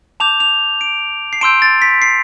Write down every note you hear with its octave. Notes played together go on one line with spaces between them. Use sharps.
A5 D6 G6 F7
F7
D7
C7
A5 C6 E6 G6 D7
A6
B6
C7